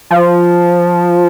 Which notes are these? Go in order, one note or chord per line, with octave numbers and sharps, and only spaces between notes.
F3